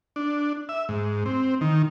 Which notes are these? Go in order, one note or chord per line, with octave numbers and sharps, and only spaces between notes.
D4
E5
G#2
C4
D#3